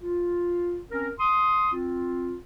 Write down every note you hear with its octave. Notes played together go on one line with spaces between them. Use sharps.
F4
C4 C#4 A#4
C6 D#6
C4 F4